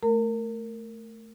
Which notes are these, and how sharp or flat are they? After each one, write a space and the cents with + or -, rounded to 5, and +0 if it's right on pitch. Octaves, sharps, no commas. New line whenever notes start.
A3 +0 A#4 -15 A#5 -45